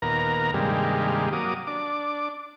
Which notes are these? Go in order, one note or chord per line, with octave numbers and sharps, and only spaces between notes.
D#2 A#2 B3 A#4 A#5
G2 C3 D#3 G3 G#3 A#3
F#3 A#3 D6 D#6
D4 D6